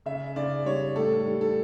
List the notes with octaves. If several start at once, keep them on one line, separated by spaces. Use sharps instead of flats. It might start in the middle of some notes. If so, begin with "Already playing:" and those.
C#3 E5
C#3 D5
G3 C#5
A2 A4
G3
A4